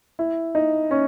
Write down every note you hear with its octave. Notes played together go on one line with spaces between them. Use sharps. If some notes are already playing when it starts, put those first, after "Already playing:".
E4
D#4
C#4